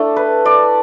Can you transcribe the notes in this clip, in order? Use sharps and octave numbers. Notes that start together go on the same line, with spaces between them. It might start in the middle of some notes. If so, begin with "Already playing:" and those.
Already playing: A3 D4 E4 A4
B4
D5